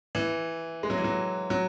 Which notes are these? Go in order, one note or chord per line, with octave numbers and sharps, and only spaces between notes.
E3
G#3
F#3
E3
F#3
F#3